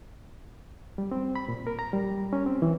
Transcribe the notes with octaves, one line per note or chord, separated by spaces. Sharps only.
G3
C4
B5
A#2
A#4
A#5
G3
C#4
C4
E3